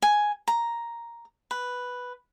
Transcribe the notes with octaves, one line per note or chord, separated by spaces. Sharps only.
G#5
A#5
B4